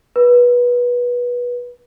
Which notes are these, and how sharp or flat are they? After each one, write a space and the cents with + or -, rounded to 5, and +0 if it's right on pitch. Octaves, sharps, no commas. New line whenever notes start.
B4 -20